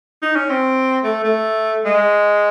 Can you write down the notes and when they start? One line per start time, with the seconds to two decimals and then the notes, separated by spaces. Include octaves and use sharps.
0.22 D#4
0.36 C#4
0.49 C4
1.04 A3
1.24 A3
1.85 G#3